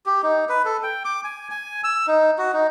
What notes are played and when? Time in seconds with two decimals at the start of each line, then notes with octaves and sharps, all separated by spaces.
0.06 G4
0.23 D#4
0.49 B4
0.65 A4
0.83 G5
1.05 D6
1.24 G#5
1.50 G#5
1.84 E6
2.07 D#4
2.38 F#4
2.54 D#4